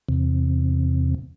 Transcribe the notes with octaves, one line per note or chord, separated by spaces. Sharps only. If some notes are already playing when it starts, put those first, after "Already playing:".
E2 C3